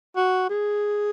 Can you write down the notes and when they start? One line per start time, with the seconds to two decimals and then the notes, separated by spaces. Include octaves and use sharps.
0.16 F#4
0.49 G#4